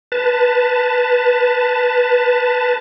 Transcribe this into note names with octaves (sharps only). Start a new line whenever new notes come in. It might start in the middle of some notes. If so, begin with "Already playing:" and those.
B4 A5